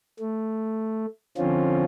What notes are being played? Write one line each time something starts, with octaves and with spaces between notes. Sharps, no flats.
A3
D3 F3 C4 C#4 F4